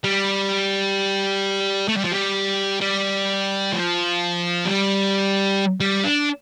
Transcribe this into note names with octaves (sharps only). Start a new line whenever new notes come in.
G3
A3
G3
F3
G3
G3
F3
G3
G3
D4